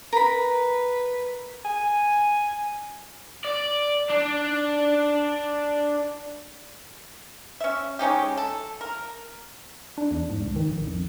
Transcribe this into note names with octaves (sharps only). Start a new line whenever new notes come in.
A#4 B4 B5
G#5
D5
D4
C#4 E5
G#3 C#4 D#4 G4
A4
A#4
D4
E2
G#2
C#2
D#3
A#1
F2